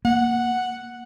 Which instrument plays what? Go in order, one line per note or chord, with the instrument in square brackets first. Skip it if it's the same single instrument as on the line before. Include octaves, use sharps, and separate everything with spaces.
[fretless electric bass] A#3 [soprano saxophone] F#5